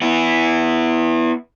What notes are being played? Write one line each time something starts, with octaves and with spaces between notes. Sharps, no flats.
B3 E4